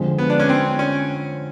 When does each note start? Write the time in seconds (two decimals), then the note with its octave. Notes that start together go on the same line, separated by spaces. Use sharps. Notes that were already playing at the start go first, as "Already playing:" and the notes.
Already playing: F2 D3 F3 G#3 C4
0.18 B3
0.30 D4
0.39 C#4
0.49 C4
0.79 C#4